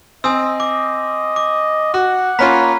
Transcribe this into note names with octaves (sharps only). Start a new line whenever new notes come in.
C4 D#5 G#5 D#6 E6
D6
D6
F#4 F#5
A#3 C#4 F4 A#5 B5 B6